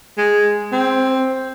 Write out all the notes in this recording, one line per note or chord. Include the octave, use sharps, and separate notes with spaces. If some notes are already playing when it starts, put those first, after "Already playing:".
G#3
C4